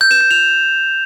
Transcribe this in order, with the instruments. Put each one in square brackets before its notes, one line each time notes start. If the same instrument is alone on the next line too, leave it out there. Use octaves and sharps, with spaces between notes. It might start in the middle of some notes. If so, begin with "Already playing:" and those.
[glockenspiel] G6
E7
G6
F7